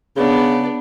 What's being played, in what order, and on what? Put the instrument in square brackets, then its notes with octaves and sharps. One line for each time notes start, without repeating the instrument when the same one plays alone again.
[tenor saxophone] C#3 [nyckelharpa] B3 D4